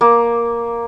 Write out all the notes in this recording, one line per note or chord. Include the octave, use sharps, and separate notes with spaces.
A#3